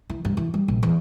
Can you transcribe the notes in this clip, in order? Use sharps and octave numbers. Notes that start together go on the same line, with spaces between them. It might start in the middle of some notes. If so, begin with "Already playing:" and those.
E3
G2
E3
G3
A#1
E2